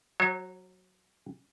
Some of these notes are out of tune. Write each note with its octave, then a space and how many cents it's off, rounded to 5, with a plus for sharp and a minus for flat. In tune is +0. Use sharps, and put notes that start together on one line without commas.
F#3 +0 C#5 -40